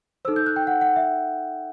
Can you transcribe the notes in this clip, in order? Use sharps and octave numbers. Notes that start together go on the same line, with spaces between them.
D#4 A4 C5 E6
G6
F#6
G5
F#5
F#5
E5